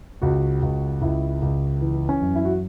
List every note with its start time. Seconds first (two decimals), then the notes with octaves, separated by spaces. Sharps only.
0.22 C#2 F#4
0.62 C#2
1.02 C#2 E4
1.42 C#2
1.81 E3
2.09 C#4
2.22 F#2
2.35 E4
2.45 F#4